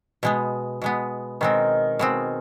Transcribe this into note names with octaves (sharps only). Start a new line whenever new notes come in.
B2 G#3 B3
B2 G#3 B3
B2 D#3 G#3 C4
B2 G#3 C4